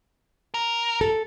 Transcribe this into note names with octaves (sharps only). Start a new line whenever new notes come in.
A#4
A4